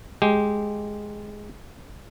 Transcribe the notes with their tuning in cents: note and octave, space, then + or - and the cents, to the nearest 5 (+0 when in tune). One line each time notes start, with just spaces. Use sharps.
G#3 +5 G4 +0